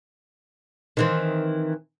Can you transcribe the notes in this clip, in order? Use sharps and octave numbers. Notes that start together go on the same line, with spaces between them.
D#3 E3 C4